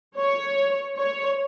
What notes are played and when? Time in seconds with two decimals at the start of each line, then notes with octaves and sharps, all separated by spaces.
0.16 C#5
0.97 C#5